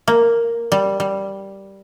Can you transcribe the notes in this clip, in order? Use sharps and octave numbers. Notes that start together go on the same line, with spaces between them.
A#3
G3
G3